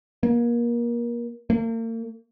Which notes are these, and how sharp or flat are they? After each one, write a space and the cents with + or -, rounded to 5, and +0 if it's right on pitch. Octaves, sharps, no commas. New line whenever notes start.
A#3 +30
A#3 -40